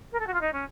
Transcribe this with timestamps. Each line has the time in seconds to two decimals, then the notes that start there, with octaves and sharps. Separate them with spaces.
0.12 A#4
0.19 A4
0.27 F#4
0.33 F4
0.41 D#4
0.52 C#4